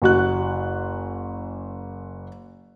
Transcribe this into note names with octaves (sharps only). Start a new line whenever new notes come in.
F#1 F#4 F#6